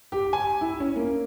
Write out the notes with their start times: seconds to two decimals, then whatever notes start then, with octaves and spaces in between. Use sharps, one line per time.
0.12 G4
0.33 G#5
0.61 E4
0.80 C#4
0.96 A#3